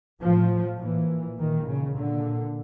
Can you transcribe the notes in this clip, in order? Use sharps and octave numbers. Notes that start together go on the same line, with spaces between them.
A2 F3
A#2 E3
A#2 D#3
C#3
A#2 D3